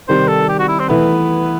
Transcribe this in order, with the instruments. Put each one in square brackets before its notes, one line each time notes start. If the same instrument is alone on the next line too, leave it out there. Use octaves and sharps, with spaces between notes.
[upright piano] C3 D#3 G3 D#4 [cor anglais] C5
[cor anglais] A4
G4
F#4
E4
C4
[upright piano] E3 A3 E4 B4 [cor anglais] B3